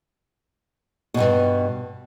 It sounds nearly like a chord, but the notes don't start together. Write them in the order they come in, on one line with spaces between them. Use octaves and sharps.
B2 E2 G2